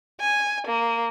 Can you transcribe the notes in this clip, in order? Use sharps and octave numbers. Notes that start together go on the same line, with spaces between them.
G#5
A#3